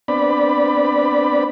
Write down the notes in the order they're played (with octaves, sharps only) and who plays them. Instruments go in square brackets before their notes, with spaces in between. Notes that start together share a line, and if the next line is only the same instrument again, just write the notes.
[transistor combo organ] B3 C4 D4 D5 B5